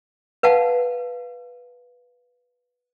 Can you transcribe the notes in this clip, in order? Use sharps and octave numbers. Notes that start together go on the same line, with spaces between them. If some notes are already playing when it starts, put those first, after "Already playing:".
B4 F5 F#5 A5